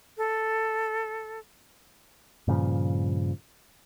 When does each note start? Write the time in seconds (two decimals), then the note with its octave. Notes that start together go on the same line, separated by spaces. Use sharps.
0.18 A4
2.48 G2 A#2 C#3 F3